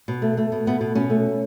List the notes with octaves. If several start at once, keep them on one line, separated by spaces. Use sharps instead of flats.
B2
A3
A3
B2
A3 B3
B2
B2 C#4
A3